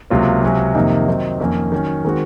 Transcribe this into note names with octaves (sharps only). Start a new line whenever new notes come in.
C#2 C3 F#3 A#3 F4
C#2 C3 F#3 C#4
F2 C3 D#3 A#3 D#4
D#3 F#3 C4 D#4
F2 D#3 A#3 C#4
D#3 F#3 C#4
D#3 G#3 C4 F#4